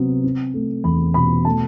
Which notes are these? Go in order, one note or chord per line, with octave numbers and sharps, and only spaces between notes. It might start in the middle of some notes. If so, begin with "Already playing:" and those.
Already playing: C3 F#3 B3
C4
A3
E2 B5
B2 B5
A3 A5